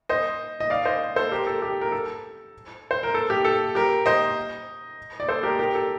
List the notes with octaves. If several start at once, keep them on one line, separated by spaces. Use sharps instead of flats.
C5 D#5
D#5
D5 F5
C5 D#5
A4 C5
G4 A#4
A4
G4
A#4
A4
C5
A#4
A4
G4
A4
G4 A#4
C5 D#5
D5
A4 C5
G4 A#4
G4 A#4
A4